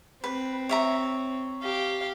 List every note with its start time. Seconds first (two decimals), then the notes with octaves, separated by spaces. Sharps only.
0.24 C4 B4
0.69 C#5 E5 A#5
1.63 G4 F5